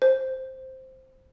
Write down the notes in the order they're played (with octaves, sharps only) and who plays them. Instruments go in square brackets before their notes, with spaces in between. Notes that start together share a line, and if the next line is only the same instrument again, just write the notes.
[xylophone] C5